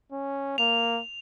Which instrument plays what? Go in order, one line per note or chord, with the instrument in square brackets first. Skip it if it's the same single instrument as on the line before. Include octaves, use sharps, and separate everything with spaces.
[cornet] C#4
[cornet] A#3 [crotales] F7